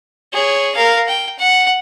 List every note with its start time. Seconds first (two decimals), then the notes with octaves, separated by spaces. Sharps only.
0.33 G#4 C#5
0.75 A#4 F5
1.08 G5
1.38 F#5